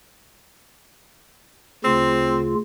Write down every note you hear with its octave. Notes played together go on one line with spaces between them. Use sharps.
D2 C#3 C4 F4